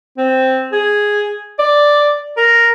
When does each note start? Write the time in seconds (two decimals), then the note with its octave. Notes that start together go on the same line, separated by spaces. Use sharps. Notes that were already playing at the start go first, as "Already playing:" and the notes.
0.17 C4
0.72 G#4
1.59 D5
2.37 A#4